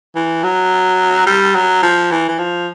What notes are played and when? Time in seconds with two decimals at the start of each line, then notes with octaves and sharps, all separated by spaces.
0.15 E3
0.43 F#3
1.26 G3
1.55 F#3
1.83 F3
2.11 E3
2.28 E3
2.38 F3